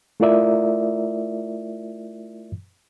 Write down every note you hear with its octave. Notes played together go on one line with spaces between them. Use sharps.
A3 E4 F4 A#4 D5 E5